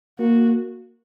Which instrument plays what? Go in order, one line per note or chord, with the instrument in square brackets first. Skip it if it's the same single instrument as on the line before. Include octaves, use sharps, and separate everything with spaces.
[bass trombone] A#3 [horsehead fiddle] F#4